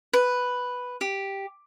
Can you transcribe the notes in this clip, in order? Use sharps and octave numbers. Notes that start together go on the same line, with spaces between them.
B4
G4